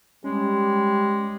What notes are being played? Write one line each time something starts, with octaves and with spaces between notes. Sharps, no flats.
G3 G#3 C#4